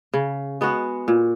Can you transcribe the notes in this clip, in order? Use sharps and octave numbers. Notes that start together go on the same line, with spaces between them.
C#3
G#3 B3 F#4
A#2